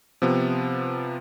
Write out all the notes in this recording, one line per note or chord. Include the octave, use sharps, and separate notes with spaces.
C3 F3 B3